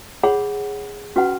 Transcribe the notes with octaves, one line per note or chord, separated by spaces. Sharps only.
G#4 C#5 F#5 B5
C#4 F#4 B4 F#5 B5